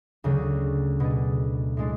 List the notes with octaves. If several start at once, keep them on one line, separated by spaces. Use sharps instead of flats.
D2 C#3 F#3
B2 A3 D4 G#4
A2 G#3 D4